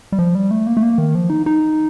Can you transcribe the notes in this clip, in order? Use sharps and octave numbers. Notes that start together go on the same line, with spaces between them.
G3
F3
G3
A3
A#3
A3
A#3
D#3
F3
D#4
D#4